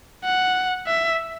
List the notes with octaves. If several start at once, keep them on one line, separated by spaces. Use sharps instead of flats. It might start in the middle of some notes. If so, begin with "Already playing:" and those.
F#5
E5